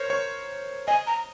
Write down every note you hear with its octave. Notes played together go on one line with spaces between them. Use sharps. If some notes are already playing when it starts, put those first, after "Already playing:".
Already playing: A#4 C5 C#5
C#5
D#5 G#5
A#5